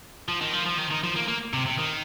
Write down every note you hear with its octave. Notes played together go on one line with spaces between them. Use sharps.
F3
D#3
F3
F3
D#3
D#3
F3
A#3
A#3
C3
C3
D#3